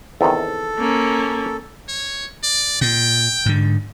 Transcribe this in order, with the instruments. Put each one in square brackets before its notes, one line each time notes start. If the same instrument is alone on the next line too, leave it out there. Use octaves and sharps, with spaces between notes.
[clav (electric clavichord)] E2 C3 D#3 [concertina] A4
[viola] A#3 C#4
[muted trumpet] C#5
D5
[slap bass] A#2 [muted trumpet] G5
[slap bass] G#2 D3